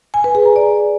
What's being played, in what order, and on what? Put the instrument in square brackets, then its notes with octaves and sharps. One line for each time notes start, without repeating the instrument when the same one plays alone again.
[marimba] G#5
B4
G#4
A#5
D5